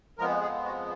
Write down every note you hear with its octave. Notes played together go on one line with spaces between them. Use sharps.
F2 F3 G#3 B3 A#4
G#4
F#4